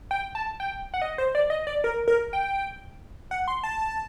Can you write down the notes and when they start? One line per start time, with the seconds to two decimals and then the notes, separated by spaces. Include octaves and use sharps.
0.11 G5
0.35 A5
0.60 G5
0.94 F#5
1.02 D#5
1.18 C5
1.35 D5
1.50 D#5
1.67 D5
1.84 A#4
2.08 A#4
2.33 G5
3.31 F#5
3.48 C6
3.63 A5